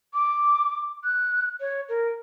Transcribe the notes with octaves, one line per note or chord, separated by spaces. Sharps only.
D6
F#6
C#5
A#4